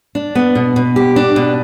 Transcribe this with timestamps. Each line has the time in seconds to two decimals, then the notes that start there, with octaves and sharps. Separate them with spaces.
0.15 D4
0.35 B3
0.55 B2
0.76 B2
0.96 G4
1.16 D4
1.36 B2